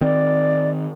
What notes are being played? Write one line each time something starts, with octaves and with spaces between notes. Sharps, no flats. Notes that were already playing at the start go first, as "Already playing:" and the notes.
D#3 C4 D5